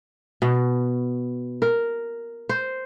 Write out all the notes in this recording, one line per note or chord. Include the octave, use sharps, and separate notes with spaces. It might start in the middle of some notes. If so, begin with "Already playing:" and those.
B2
A#4
C5